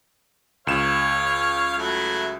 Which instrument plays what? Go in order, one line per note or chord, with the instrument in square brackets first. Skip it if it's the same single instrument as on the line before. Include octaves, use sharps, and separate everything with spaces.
[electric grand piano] C#2 E7 [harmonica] C#5 F5
[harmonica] F#3 A3 E4